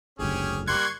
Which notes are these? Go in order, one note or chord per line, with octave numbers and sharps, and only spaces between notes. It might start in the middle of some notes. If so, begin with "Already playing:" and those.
F#1 D2 G#2 C#4 G4 G#4
G3 A#3 C6 C#6 F#6 G#6